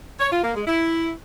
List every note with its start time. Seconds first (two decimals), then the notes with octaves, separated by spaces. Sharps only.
0.20 C#5
0.31 F4
0.43 A#3
0.55 G#3
0.67 E4